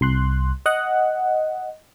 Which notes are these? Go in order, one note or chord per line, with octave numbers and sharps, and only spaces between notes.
C2 C6 F#6
D#5 F#5